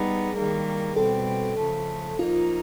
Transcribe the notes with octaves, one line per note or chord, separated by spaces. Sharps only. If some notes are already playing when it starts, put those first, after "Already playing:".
Already playing: G3 B3 D#4 G#4
D#3 G3 A#3
B2 G3 C4 A4
C#3 F3 A3
F3 A#3 D#4 F4